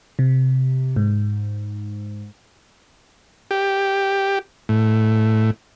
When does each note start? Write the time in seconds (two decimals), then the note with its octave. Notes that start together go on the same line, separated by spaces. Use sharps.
0.19 C3
0.96 G#2
3.51 G4
4.69 A2